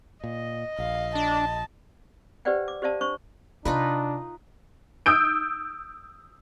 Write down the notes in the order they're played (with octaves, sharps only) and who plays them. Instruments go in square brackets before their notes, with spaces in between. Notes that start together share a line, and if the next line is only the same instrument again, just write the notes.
[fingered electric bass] A#2 [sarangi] D#5
[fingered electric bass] A#1 [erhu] F5
[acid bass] D4 [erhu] A5
[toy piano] G4 B4 C5 D5 F#5 G5
D6
G4 C5 D5 F5 A5
D4 C5 C#6
[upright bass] C3 [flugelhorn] D4 [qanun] D#4 F4 B4
[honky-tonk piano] D#6 E6 G6 D7